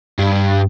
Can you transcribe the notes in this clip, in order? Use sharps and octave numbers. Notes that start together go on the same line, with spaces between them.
G2